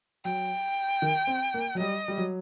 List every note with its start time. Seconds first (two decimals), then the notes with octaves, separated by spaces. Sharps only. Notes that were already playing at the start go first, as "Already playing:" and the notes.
0.25 F#3 G5
1.02 D#3
1.27 C4
1.54 A#3
1.75 F#3
1.79 G3 D#5
2.08 G3
2.18 F#3